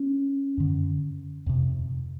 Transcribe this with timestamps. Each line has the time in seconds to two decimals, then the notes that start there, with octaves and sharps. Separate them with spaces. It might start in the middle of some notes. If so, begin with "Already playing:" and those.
Already playing: C#4
0.57 F#2 D3
1.46 F2 C3